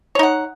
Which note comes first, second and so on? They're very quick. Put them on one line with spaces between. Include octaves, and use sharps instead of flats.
C#5 D#4 F#5